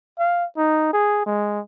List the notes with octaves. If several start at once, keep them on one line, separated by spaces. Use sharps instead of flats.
F5
D#4
G#4
G#3